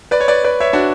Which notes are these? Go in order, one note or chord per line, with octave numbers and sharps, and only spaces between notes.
B4 D5
C#5
B4 D5
B4 D5
C#5 E5
D4 F#4